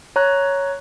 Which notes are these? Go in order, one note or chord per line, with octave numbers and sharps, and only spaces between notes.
C#5 A#5 F#6